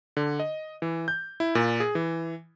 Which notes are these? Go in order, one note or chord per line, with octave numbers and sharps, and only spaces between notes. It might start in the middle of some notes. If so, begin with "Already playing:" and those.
D3
D#5
E3
G6
E4
A#2
G#4
E3